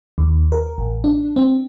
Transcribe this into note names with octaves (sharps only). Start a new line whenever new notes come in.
D#2
A#4
A1
D4
C4